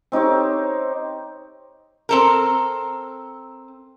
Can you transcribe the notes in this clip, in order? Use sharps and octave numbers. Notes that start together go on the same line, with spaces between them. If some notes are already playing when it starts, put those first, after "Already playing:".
C4 D#4 G4 C#5
C4 A4 A#4